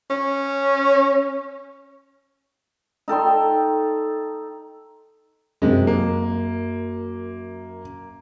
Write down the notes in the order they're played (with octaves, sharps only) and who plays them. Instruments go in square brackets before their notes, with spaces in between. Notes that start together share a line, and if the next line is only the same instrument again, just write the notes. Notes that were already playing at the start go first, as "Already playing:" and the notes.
[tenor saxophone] C#4
[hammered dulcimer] D#4 A4 G5 C6
[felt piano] F#2 [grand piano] C3 G#3
[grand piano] A#3